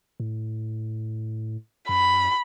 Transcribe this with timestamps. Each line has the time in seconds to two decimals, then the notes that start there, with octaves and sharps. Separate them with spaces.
0.20 A2
1.89 F#2 B5